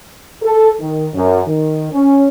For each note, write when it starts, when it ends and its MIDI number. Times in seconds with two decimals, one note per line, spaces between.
0.42 0.70 69
0.80 1.08 51
1.14 1.41 42
1.46 1.92 51
1.92 2.27 61